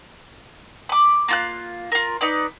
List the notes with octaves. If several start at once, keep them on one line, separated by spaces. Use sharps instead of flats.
B5 D6
A#3 F4 F#6
F4 A#4
D#4 B4 D5